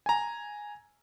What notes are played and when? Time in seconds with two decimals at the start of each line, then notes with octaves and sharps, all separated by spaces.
0.06 G#5 A#5